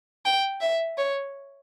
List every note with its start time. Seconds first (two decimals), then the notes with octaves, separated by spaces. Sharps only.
0.25 G5
0.61 E5
0.97 C#5